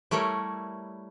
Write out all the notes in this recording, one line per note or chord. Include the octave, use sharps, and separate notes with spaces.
G3 A3 E4 A#4 C#5